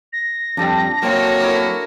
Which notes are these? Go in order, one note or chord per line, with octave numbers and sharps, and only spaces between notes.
A#6
F2 G3 C4 D4 A4
F#3 A#3 C4 F#4 C#5
E4 A#4 D6